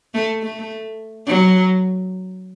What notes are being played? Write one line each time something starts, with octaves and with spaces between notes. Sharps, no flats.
A3
A3
F#3